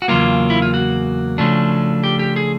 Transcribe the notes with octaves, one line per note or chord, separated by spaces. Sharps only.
F#4
E2 C#3 F#3 A#3 F4
E4
F4
F#4
C#3 F3 A3 D4
G4
G4
G#4